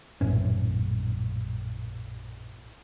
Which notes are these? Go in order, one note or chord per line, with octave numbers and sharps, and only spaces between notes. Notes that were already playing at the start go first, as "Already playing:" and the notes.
A#1 F#2 A2 C#4